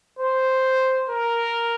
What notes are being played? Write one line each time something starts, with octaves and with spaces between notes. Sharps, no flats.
C5
A#4